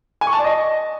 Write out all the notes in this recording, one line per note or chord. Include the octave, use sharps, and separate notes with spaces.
G#5
C#6
A5
D5
D#5